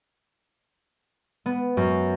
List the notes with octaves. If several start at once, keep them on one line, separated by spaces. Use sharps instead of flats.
B3
F#2